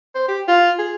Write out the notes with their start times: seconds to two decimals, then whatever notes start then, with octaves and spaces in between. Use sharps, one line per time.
0.15 C5
0.28 G4
0.48 F4
0.79 G#4